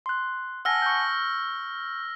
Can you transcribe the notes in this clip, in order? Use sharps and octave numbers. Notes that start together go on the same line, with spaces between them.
C6 F#6
F#5 G#5 A5 E6 F6 A#6
C#6 G6